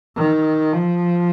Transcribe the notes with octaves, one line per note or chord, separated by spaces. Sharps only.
D#3
F3